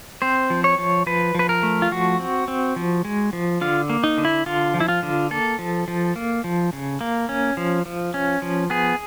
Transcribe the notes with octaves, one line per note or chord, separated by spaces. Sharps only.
C4 C5
F3
C#5
F3
F3 B4
F3 B4
A#4
A3
F4
F3 F#4
C4
C4
F3
G#3
F3
D3 F4
A#3
D#4
D3
E4
D3 F4
F3
E4
F4
D3
A#3 A4
F3
F3
A#3
F3
C#3
A#3
C#4
F3
F3
C#4
F3
B3 G#4